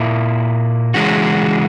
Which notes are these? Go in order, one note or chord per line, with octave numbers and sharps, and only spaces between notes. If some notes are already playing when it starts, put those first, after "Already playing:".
Already playing: A#2 A#3 E4
C#3 E3 G#3 C#4 F#4